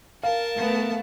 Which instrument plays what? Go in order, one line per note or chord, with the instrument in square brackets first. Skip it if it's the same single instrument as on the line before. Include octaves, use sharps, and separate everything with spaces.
[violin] A#4 A5 [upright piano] F5
[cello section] A3 B3